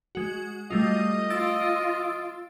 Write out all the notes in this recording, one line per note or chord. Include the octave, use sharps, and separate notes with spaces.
G#3 F#4
G3 A3 F4 D#5
F4 E6 A6 D7